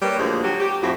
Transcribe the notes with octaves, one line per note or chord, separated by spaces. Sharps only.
G3 A#3 B4 C#5
D2 A#2 F3 G#3 A#3 C5
F#3 G4
G4
F2 A2 F3 C4 E4 F#4